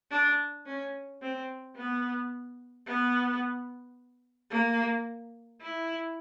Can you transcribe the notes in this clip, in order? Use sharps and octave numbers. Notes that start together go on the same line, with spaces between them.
D4
C#4
C4
B3
B3
A#3
E4